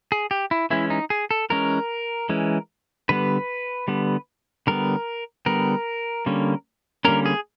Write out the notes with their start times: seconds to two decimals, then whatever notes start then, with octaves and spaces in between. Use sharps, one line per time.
0.12 G#4
0.31 G4
0.51 E4
0.70 E3 G#3 C#4 E4
0.90 D#4
1.10 G#4
1.31 A4
1.50 E3 G#3 C#4 A#4
2.29 E3 G#3 C#4
3.09 D3 G3 B3 B4
3.88 D3 G3 B3
4.67 D3 G3 B3 A#4
5.46 D3 G3 B3 A#4
6.26 D3 G3 A#3 C#4
7.05 D3 G3 A#3 C#4 A#4
7.26 G#4